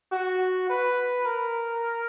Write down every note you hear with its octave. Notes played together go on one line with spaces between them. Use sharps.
F#4
B4
A#4